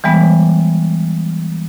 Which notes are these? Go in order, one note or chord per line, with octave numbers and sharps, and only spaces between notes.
E3 G3 G#3 B3